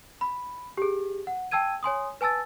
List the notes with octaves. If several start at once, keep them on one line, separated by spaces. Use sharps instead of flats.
B5
G4 G#4
F#5
G5 A5 E6 G#6 D#7
C#5 G#5 C6 D#6
B4 G#5 A5 E6 A6